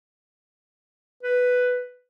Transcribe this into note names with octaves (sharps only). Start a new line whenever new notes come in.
B4